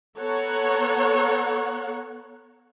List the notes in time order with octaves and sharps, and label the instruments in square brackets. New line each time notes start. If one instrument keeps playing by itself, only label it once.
[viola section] B3 A4 C#5 F#5 A#5